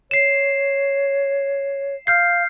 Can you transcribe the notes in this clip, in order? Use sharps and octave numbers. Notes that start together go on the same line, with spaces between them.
C#5 C7 E7
F5 F6 G6 C7